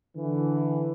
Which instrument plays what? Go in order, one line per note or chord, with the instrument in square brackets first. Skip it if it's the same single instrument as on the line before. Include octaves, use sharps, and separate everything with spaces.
[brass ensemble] D3 E3